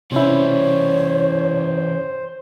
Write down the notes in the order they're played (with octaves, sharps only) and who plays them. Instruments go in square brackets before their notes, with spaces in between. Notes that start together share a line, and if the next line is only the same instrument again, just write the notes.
[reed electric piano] C3 C#4 E4 [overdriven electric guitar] E3 G3 [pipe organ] C5 [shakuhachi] C#5